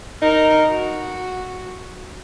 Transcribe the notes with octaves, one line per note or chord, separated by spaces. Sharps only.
D#4 A#4
F#4